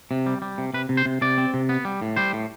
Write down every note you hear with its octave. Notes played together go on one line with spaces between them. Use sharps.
C3
G3
G3
C3
C3 B4
C3
C5
C3
C3 D5
C4
C3
B3
G3
A2
G3 C5
A2